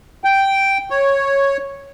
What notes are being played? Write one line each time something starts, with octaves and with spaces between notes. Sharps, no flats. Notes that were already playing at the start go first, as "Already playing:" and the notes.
G5
C#5